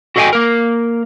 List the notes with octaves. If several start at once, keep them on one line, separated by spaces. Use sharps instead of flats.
F#4 A4 D#5 F5 G5 G#5
A#3 A#4